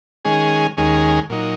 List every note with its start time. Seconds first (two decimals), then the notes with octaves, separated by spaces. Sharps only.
0.25 D#3 G#3 C#4 G#4
0.77 D#2 D#3 G#3 C#4 G#4
1.30 A#2 F#3 D#4